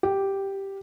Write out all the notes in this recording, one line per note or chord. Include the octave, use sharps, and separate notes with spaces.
G4